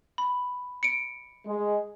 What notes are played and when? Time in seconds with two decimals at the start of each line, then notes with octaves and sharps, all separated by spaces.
0.18 B5
0.83 C#7 D7
1.46 G#3